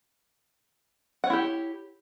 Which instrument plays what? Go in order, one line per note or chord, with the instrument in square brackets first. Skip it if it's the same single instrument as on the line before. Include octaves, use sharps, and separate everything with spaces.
[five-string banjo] F#5
C#5
E4
G4